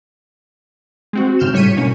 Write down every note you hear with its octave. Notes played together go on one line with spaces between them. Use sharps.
G#3 C4 F#4
G#2 C#3 F6 G6 E7
A2 G3 C#5 B6 C#7 D#7
B2 A#3 C#4